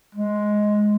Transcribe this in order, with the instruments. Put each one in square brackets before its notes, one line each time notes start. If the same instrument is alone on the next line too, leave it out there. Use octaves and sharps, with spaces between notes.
[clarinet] G#3